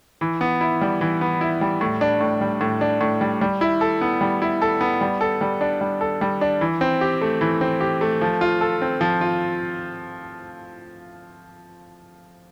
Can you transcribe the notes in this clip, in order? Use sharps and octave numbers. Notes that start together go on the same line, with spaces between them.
E3
B3
E4
G3
E3
B3
E4
G3
A2
D4
A2
G3
A2
D4
A2
G3
G3
E4
A4
B3
G3
E4
A4
B3
G3
A4
G3
D4
G3
A4
G3
D4
E3
C4
G4
A3
E3
C4
G4
A3
F3
F4
A4
C4
F3
F4